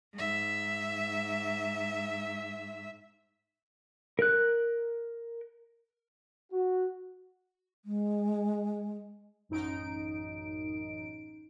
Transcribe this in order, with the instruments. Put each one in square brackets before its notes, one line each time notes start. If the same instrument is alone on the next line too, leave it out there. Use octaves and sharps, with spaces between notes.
[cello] G#2 E5
[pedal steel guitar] A#4 F#6
[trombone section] F#4
[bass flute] G#3
[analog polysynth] A1 F#2 D#4 D7